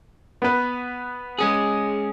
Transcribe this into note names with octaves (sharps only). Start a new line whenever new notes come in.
B3 B4
G#3 C#4 G#4